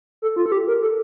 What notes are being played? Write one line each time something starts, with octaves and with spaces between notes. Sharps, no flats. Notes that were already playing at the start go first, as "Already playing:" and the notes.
A4
F4
A4
G4
A#4
A4